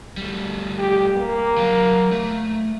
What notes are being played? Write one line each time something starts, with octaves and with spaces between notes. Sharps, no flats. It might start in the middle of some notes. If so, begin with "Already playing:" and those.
G3 A3
G4
A#3
F#3 F5
A3